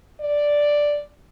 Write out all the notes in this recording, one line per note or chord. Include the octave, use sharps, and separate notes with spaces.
D5